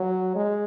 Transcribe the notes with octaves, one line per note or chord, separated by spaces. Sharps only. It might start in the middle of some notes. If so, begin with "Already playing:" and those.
Already playing: F#3
G#3